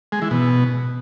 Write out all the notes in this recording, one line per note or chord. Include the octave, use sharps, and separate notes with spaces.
G#3
E3
B2